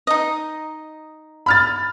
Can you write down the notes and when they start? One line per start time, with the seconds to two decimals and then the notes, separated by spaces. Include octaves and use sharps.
0.07 D#4 D#5
1.46 B5 F6 A6